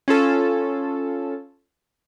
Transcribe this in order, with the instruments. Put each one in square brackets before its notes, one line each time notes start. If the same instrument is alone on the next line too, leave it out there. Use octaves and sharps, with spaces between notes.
[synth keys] C#4 F4 A4